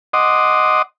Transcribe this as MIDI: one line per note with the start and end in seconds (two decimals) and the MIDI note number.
0.13 0.82 75
0.13 0.82 78
0.13 0.82 84
0.13 0.82 86
0.13 0.82 87